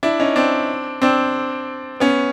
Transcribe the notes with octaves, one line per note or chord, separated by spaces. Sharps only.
D4 E4
C#4 D#4
C4 D4
C4 D4
B3 C#4